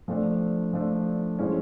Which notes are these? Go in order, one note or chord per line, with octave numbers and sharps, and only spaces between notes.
F3 A3 D4
F3 A3 D4
F3 G#3 C#4 E4